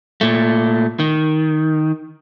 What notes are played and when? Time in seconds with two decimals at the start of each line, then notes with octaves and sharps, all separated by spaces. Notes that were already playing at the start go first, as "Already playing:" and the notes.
0.21 A#2 A3
1.00 D#3